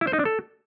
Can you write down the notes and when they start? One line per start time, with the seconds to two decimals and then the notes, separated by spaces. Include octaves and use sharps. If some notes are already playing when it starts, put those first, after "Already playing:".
0.01 E4
0.07 C5
0.13 D#4
0.19 D4
0.25 A4